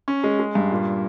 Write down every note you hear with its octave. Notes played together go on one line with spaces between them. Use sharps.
C#4
G#3
G#3
G2
A#2